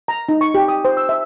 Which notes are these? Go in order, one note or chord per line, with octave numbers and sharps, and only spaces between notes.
A#5
D#4
C#6
G4
D#6
C5
E6
E5